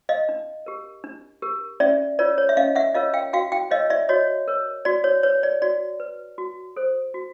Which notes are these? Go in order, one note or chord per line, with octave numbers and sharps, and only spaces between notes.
D#5 F5
D4
G4 A#4
D4
G4 A#4
C#4 D5 E5
F4 A#4 C#5 D5
C#5
E5
C#4 D#5 F5
E5 F#5
F4 A#4 C#5 D#5 F5
F5 G5
F#4 F5 G5
F5 G5
A#4 C#5 D#5 F5
D5 E5
F#4 C#5 D#5
A#4 C#5
F#4 D5
C#5
B4 C#5
D5
F#4 D5
B4
F#4
A4 C5
F#4